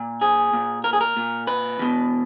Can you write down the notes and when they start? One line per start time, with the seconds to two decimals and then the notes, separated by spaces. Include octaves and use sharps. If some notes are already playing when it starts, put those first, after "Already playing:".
Already playing: A#2
0.21 G#4
0.53 A#2
0.84 A#4
0.93 G#4
1.01 A#4
1.17 A#2
1.47 B4
1.79 E2 B2